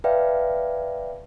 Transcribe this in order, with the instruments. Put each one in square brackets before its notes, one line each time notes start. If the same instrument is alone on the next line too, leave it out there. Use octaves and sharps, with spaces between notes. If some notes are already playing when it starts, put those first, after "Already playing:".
[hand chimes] B4 D5 E5 F5 G5 A5